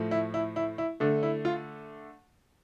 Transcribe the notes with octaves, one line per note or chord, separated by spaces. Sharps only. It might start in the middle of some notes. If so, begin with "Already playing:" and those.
Already playing: A2 F3 A3
E4
E4
E4
E4
D3 A3 D4
E4
F4